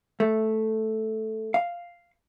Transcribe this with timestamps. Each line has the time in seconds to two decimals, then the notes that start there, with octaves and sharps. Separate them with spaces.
0.20 A3
1.54 F5